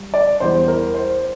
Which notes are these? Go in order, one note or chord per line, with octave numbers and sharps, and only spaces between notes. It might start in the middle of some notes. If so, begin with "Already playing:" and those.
Already playing: G3
D5
E2 E3 G3 C5
A#4
C5